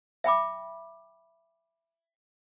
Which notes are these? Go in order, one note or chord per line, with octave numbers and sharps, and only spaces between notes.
E5 G5 B5 D6